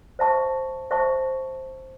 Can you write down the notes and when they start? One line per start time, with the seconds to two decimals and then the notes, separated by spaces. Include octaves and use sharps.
0.19 C5 E5 A5 C#6
0.91 C5 E5 A5 C#6